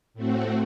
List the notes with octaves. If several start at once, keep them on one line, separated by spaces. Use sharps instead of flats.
A2 A3 C4 F#4